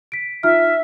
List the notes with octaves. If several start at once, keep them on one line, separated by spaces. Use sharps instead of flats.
B6 D7
D#4 F4 E5 F6